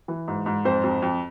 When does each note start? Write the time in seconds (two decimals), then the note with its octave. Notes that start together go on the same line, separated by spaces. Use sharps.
0.08 E3
0.28 G#2
0.46 G#2
0.65 F2 C5
0.84 F2
1.02 F2